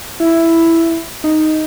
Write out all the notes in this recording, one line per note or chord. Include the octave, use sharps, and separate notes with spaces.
E4
D#4